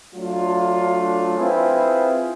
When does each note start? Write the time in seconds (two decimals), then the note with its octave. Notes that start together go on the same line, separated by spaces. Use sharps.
0.15 F#3 A3 D4 F4
1.38 C4 E4 F4 G#4 B4